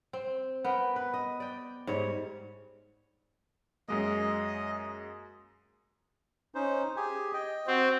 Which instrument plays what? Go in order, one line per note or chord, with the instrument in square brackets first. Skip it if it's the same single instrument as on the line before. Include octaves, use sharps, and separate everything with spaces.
[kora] C4
B3 A#4 G5
B4
D#5
D5 G5
G#2 G3 C#5
[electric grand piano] F#2 G#3 A#3 [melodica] D#5
[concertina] C#4 D#4 C5
G4 G#4 G#5
D#5 G5
[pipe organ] C4 [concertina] F#4